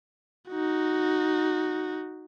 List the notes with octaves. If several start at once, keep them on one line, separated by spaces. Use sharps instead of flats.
D#4 F#4